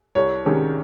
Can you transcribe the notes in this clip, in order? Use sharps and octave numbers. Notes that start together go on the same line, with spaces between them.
C2 C#5
C3 D#3 G#3 C#4